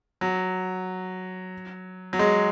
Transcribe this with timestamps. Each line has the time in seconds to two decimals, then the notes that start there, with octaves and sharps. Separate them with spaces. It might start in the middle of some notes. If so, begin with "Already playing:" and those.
0.21 F#3
2.13 F#3
2.19 G#3